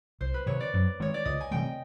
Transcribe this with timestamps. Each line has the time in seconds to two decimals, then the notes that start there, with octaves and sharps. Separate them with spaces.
0.21 C2 C5
0.34 B4
0.46 C3 D#3 C#5
0.60 D5
0.74 F#2
1.00 D#3 G#3 C#5
1.14 D5
1.25 C#2 D#5
1.40 G#5
1.51 C3 E3 A3 G5